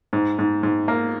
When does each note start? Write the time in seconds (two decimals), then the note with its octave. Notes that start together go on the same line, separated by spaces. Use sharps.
0.13 G#2
0.39 G#2
0.63 G#2
0.88 A#3